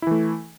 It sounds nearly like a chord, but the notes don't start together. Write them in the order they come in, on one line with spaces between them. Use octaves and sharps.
E4 E3 A3